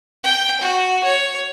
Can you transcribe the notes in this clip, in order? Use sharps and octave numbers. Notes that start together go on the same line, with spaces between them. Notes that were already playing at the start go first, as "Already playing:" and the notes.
G5
F#4
C#5